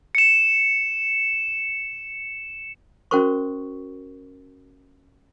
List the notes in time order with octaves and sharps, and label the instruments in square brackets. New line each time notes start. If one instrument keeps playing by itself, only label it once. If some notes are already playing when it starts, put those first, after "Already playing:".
[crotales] C#7 E7
[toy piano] C#4 F#4 A#4 C5 C#6